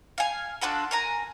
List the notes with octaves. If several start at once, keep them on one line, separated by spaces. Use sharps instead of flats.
F5 G#5
D4 F4 F#4 A4
A#4 G#5 A#5